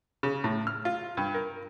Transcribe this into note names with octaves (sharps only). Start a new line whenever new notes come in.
C#3
A2
F6
F4
G2
A#4